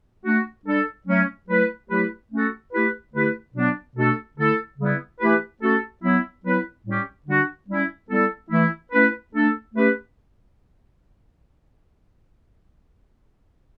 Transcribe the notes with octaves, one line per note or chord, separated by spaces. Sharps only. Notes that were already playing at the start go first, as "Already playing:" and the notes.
A3 D4 F#4
G3 D4 A4
F#3 A3 C#4
F#3 A3 E4 B4
F#3 A3 E4 G4 B4
A3 C#4 F#4 A4
A3 E4 G4 B4
D3 A3 E4 G4 B4
B2 F#3 B3 D4
B2 A3 D4 F#4 A4
D3 A3 E4 A4
C#3 G3 B3 E4
E3 A3 E4 G4 B4
A3 C#4 F#4 A4
F#3 B3 E4
F#3 B3 E4 B4
A2 G3 C#4 G4
D3 G3 D4 F#4
G3 C#4 E4
G3 B3 E4 A4
E3 A3 E4
A3 C#4 E4 B4
A3 D4 A4
A3 C#4 G4 B4